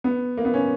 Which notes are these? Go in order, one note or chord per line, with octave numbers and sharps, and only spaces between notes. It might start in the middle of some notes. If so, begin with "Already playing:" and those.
B3
A#3
B3
C#4